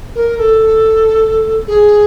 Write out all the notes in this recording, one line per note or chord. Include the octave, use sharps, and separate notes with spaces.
A#4
A4
G#4